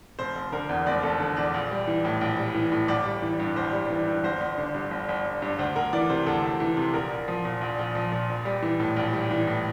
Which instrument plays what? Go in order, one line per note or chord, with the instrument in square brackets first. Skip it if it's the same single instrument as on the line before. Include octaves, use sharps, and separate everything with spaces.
[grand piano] F1 C5
F1
D3 A#4
E2
F1 D5
F1 A4
D3
E2 D5
A#1
G3
E3
A2
A#1
G3
E3
A2
G1 D5
G3
E3
G2
G1 C5
G3
E3
G2
G1 C5
G1
D3
G2
G1
G1
D3
G2
D2 C5
D2 A#4
E3 D5
C3 C5
D2 A4
D2
E3
C3
A#1 A#4
A#1
F3
A#2
A#1
A#1
F3
A#2
A#1
G3
E3
A2
A#1
G3
E3
A2